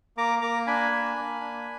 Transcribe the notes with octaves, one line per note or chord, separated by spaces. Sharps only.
A#3 A#5 D6
A#3 A#5 D6
D4 G#5 B5
A#3
A#3
D4